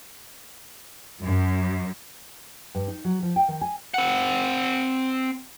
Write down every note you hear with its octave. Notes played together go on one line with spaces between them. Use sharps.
F#2
G2
D#4
F#3
F3
G5
D#3
G#5
C4 F#5